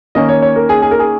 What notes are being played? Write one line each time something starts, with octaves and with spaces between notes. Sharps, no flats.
D#3 A#3 C#4 D#5
C#5
C#5
A#4
G#4
G#4
A#4
G#4